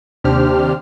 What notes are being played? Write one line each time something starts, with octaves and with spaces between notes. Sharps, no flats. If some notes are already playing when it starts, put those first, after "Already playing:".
D#2 C3 D4 G4 C5 F6